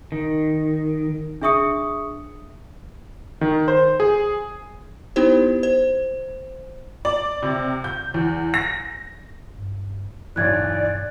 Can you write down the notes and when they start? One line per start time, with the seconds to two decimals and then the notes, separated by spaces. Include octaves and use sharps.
0.12 D#3
1.41 D4 G#4 E5 C#6 D#6 C#7
3.41 D#3
3.68 C5
4.00 G#4
5.16 B3 D#4 E4 G4 C5
5.63 C5
7.05 D5
7.43 C3
7.84 G6
8.14 E2
8.54 A#6
9.58 G2
10.36 B1 E2 G2 E3 D5 F#6 G#6 A6